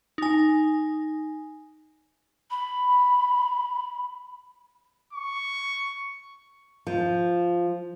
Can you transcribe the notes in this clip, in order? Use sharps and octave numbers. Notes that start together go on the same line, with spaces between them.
D#4 G#5
B5
C#6
F3